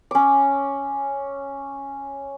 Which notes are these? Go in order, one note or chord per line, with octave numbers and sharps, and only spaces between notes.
C#4 D6